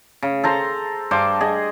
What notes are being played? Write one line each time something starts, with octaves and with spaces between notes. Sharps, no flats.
C#3
A4 C5 A#5
G2 C5 D6
G#4 D#5